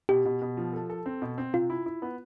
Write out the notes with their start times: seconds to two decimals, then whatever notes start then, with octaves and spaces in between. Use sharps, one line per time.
0.09 B2 G4
0.25 B2
0.42 B2
0.57 F3
0.73 A4
0.90 A4
1.06 C4
1.22 B2
1.38 C4
1.53 C3 F4
1.70 E4
1.86 E4
2.02 B3